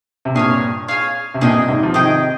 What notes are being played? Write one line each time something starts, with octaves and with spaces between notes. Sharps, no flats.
C3
G2 A#2 G#4 C#5 F5
G#4 C#5 F5
C3
G2 A#2 G#4 D#5 G5
G#2 C3
F3
C3 D#3 G#4 D#5 G5